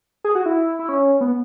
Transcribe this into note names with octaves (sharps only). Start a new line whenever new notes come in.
G#4
F#4
E4
E4
C#4
B3